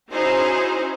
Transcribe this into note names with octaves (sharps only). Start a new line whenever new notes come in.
C#4 D#4 E4 F#4 G#4 C5